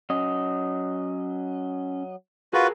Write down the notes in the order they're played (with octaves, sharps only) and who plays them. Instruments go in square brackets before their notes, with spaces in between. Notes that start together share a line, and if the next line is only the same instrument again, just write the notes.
[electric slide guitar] F#3 D#5 [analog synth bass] C#4
[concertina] F4 F#4 B4 [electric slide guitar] G#4 A#4